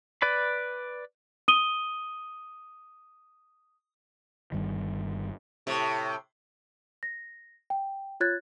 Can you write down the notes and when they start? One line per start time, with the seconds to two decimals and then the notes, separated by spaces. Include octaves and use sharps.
0.22 B4 D5 B5
1.48 D#6 D#7 G7
4.52 G1 G2 D#3
5.67 A2 C3
7.03 A#6
7.70 G5
8.20 F4 C#5 F#6 G#6 A6